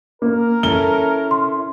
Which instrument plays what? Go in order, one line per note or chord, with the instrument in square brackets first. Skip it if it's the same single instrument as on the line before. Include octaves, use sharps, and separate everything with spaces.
[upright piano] A#3 [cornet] A#4
[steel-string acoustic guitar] C#4 E4 A4 [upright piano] G7
[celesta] C6